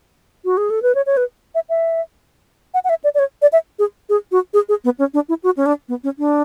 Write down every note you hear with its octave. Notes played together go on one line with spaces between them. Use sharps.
F#4
G#4
A4
B4
C#5
C#5
B4
E5
E5
F#5
F#5
E5
D5
D5
C#5
D5
E5
G#4
G#4
F#4
G#4
G#4
B3
C#4
D4
E4
F#4
C#4
D4
B3
C#4
D4